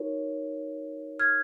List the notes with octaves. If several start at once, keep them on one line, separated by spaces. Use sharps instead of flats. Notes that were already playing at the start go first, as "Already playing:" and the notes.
Already playing: D#4 F#4 A#4 C#5
F6 G#6